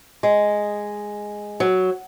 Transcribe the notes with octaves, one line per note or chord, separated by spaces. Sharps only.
G#3
F#3